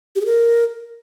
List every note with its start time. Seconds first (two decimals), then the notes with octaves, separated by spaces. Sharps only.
0.16 G4
0.21 G#4
0.26 A#4